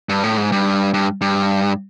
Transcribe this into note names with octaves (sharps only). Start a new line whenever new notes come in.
G2
A2
G#2
G2
G2
G2